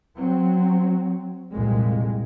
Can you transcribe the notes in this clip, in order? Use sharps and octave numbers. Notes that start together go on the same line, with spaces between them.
F#3 C4
C2 F2 A#2 G#3